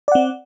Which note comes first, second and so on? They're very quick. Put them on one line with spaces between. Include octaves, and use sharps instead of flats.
D5 F#5 C4